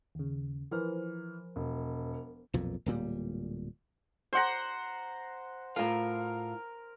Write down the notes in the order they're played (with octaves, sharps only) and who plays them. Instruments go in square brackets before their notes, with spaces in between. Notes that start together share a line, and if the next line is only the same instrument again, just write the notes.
[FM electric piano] D#2 C#3
[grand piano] E3 F6 [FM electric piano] F3 A#4 C5
[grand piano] E1
[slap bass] B1 F2 A#2
D1 A#2 G3
[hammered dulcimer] C5 F#5 A#5
[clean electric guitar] A2 F4 [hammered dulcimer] A#4 A#5